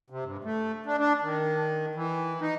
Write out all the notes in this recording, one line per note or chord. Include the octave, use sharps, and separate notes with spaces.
C3
G2
A3
D4
D4
D#3
E3
D#4